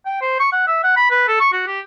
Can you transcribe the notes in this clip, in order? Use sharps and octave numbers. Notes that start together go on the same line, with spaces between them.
G5
C5
C#6
F#5
E5
F#5
B5
B4
A4
C#6
F#4
G4